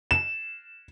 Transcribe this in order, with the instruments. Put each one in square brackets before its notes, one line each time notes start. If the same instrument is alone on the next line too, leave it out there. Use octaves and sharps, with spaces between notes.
[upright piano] E7